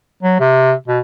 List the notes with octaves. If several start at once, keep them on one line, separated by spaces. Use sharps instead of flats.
F#3
C3
B2